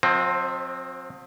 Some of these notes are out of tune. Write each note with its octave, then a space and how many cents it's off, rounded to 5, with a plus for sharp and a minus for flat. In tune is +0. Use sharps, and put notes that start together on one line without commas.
F3 +45 C4 +10 D#5 +0